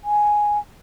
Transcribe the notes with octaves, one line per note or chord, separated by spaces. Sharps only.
G#5